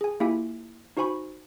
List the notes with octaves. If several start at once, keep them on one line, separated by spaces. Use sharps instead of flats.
G#4 G#5
A#3 E4 F4 G4 E5 G#5
D#4 F#4 C5 G#5 B5 C#6